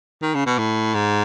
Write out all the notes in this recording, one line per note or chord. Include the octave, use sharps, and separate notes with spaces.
D#3
C#3
B2
A2
G#2